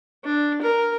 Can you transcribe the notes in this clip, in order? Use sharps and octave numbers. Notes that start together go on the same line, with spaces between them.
D4
A#4